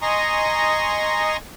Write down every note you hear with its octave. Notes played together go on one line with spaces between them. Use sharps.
D#5 G#5 A#5 C6 C#6 D#6